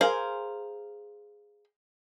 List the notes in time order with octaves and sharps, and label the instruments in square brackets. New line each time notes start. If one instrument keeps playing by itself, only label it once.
[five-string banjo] G#4 A#4 C5 F5